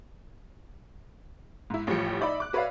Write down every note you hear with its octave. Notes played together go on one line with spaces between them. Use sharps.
G#2 E4
A1 A2 E3 F3 G3 C#7
D#4 D5 E5 B5
D6 F#6
F#4 B4 C#5 D5 E5 F5